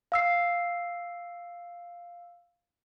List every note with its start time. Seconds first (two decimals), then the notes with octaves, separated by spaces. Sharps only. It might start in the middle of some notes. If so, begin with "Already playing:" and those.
0.12 F5 E6 C7